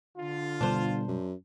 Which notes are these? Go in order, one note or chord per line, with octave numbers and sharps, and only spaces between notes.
D3 F4
G1 B2 G3 D4 C5
F#2